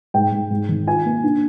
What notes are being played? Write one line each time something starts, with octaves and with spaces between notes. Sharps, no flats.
G#2 G5
G#2
G#2
D#3
F4 G#5
A#3
D4